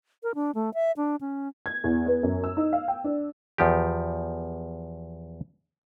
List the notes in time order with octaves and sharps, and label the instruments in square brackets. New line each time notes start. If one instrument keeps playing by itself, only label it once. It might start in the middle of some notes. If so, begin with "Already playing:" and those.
[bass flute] A#4
D4
A3
E5
D4
C#4
[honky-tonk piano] G#6
E2
B3
F#2
E6
D#4
F5
G5
D4
[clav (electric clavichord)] E2 F3 G4